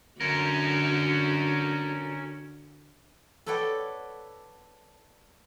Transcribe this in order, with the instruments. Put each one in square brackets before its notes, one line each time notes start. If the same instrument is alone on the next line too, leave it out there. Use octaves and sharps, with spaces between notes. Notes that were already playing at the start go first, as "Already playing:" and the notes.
[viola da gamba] D3 F#4 [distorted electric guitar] C#4 A#4
[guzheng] A4 B4 C#5 D5 F#5 G5